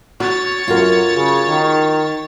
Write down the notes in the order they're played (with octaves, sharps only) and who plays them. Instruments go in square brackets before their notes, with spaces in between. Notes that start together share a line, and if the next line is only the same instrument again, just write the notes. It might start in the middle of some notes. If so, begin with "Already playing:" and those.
[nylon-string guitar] F#4 [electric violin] C#5 A6
[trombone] F#2 [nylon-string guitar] F4 F#4 A#4
[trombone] C#3
D#3